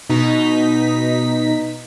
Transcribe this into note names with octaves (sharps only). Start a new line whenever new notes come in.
B2 D#4 B6